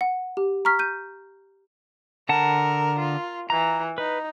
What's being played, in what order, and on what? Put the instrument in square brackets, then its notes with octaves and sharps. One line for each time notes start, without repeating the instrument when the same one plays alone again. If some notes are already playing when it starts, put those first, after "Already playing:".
[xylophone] F#5
G4
A#5 C#6 F6 B6
G6 D#7
[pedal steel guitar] D3 F#5 A5 [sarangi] A#4
[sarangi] F4
[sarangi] E3 [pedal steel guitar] A#5
[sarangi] D#4 [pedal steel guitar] B4